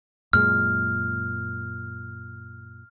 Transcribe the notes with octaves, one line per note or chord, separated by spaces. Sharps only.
F#2 A#2 G#3 F6